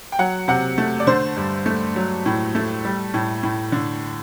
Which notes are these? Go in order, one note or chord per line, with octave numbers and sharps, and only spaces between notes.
G5
F#3 F#5
C3 F#5
A3
D5
D3 C5
G2
A3
F#3
A2
A3
G3
A2
A2
D3